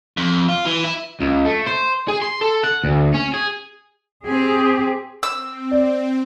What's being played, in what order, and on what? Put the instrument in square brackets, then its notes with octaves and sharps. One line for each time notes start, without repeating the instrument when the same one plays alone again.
[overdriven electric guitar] F2
F4
E3
E4
C#2
A3
C5
G#4
C6
A4
F#5
D2
C#4
G#4
[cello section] C4 G4 G#4
[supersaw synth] C4 [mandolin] E6
[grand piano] D5